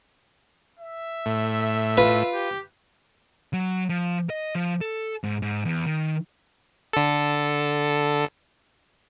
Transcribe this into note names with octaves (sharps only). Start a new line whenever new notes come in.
E5
A2
F4 B4
G4
F#3
F3
D#5
F3
A4
G#2
G#2
E2
D#3
D3 A4